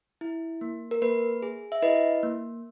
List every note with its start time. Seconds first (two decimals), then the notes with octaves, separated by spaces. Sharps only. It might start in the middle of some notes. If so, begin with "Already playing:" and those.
0.21 E4
0.61 A#3
0.91 A#4
1.02 A#3 B4
1.42 G#4
1.72 E5
1.82 E4 B4 D#5
2.23 A#3